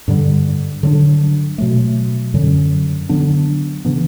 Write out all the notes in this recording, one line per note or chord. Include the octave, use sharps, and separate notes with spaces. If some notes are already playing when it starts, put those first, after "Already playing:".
G2 D3 G3
D3 F#3 B3 D4
B2 F#3 A3
F#2 D3 F#3 C#4
D3 F#3 B3 D4
C#3 E3 B3 D4